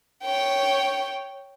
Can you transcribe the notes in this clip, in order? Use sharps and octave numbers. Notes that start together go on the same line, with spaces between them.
C#5 G5